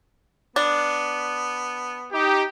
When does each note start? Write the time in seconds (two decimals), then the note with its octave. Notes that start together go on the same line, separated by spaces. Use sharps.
0.56 B3 D4
2.13 D#4 G4